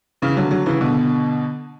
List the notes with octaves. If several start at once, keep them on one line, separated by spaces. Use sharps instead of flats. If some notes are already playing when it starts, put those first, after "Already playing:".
C#3 E3
D3 F#3
D3 F#3
C#3 E3
B2 D3